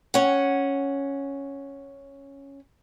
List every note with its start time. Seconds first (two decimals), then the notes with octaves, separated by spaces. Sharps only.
0.14 C#4 F#5